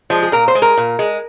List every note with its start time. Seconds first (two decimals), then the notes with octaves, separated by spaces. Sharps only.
0.10 F3 G#3
0.23 G#4
0.32 A#2 A#4
0.48 C5
0.55 G#3
0.62 A#4
0.77 A#2
0.99 G#3